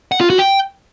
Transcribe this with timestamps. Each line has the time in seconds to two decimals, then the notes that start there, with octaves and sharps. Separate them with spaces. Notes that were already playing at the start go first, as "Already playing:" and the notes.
0.12 F#5
0.21 F4
0.30 F#4
0.39 G5